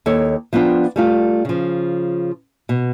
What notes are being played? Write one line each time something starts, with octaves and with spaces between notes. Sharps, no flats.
D#2 A4 C#5
F3 B3 D4 F4 G5
G3 A3 F4
C#3 F3
B2